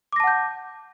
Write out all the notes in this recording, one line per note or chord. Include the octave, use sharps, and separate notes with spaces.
F#5 A5 D6 G6 A#6